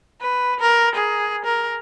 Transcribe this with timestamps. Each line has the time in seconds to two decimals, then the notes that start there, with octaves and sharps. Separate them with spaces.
0.21 B4
0.60 A#4
0.95 G#4
1.45 A#4